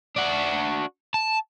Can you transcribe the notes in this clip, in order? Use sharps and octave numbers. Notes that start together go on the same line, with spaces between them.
D4 F#4
A5